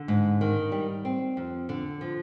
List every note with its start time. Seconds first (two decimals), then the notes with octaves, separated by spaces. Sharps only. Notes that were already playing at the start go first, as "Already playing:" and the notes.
Already playing: D3
0.08 G#2
0.41 D#3
0.72 G3
1.05 C4
1.37 F2
1.69 D3
2.01 F3